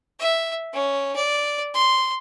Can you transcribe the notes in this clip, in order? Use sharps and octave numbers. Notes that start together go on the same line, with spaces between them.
E5
C#4
D5
C6